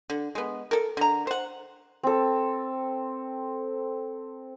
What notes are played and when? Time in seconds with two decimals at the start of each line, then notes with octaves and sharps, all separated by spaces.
0.10 D3
0.35 G#3 B3
0.71 A4 A#4
0.97 D3 A#5
1.27 C5 F#5
2.03 C4 A4